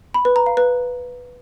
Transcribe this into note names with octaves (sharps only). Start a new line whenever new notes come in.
B5
B4
A#5
F5
B4